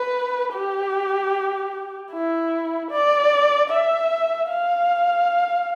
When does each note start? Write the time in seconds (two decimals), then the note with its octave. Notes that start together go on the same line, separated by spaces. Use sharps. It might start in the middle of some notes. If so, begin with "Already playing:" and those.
Already playing: B4
0.53 G4
2.11 E4
2.91 D5
3.70 E5
4.49 F5